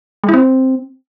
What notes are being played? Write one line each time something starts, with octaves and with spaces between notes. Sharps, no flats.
G#3
E4
C4